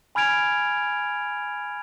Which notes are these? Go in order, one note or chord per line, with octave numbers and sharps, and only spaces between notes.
G#5 B5 F6 G#6 D7 F7